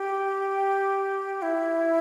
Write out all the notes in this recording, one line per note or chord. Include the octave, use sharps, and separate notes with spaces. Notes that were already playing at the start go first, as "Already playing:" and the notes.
Already playing: G4
E4